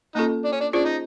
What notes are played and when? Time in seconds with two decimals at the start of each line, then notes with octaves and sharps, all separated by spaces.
0.15 A#3 C#4 D#4 F4 A4
0.45 D4
0.52 C#4
0.61 D4
0.73 C#4 D4 F4 G#4 C5
0.85 D#4